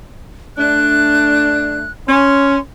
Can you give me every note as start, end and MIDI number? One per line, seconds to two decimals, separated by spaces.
0.57 1.84 57
0.57 1.84 62
0.57 1.91 90
2.08 2.57 61
2.08 2.60 84